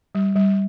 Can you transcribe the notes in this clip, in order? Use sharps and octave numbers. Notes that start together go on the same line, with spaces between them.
G3
G3